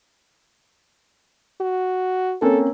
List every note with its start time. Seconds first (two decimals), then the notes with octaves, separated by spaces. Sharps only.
1.61 F#4
2.42 A#3 C4 C#4 A4